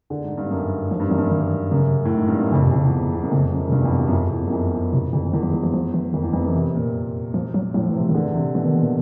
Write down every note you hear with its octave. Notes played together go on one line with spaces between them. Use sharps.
D3
G#2
G2
F#2
G#2 F3
G2
F#2 E3
G2
D#3
F#2 C#3
A2
G#2
G2
F#2
F2 C#3
C3
F2 C#3
E2
E2
F#2
F2 C#3
F#2
C#3
G2 C3
E2
F2
E2
F#2
F2
E2
F#2
F2
E2
E2 C3
F2 D3
F2
E2 D#3
E3
E3
F3
F3
E3
F2 D#3
E2
F2 E3
F#2
C3
A#2
F3
F#3
A2 F#3
F3
E3
C3 F3
D#3
D3 E3
C3
B2 E3
D#3
A#2 E3